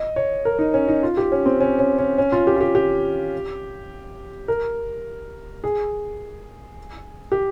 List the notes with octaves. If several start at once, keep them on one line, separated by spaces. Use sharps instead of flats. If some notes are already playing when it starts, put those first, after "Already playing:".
Already playing: D#5
C#5
A#4
D#4
C#4
D#4
F4
G4
C#4
C4
C#4
C#4
C#4
C#4
F4
G4
F4
G4
G4
A#4
G#4
G4